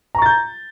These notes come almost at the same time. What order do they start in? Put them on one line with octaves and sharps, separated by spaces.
A#5 C#6 A6 G6